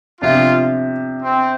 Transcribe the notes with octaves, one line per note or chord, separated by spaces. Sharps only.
C3 F3 D4 F4
C4